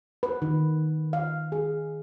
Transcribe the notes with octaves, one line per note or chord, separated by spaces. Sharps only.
B4
D#3
F5
G#4